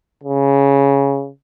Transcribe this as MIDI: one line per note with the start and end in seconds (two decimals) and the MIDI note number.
0.24 1.29 49